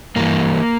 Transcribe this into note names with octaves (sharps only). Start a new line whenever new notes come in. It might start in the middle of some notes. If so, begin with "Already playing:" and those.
G2 E3 A#3